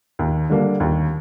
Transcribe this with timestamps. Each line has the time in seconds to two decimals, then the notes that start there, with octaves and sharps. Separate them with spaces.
0.19 D#2
0.50 D3 G3 A#3
0.80 D#2